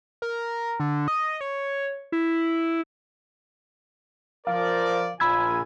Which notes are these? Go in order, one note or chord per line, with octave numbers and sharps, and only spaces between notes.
A#4
D3
D#5
C#5
E4
F3 A#4 D5 F5
A#1 F4 G#5 B5 E6 G#6